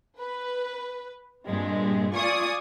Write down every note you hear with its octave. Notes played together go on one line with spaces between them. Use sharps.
B4
G2 A#2 G#3 C4
F4 D5 G#5 C#6 D#6